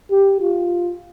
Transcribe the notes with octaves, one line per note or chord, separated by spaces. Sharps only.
G4
F4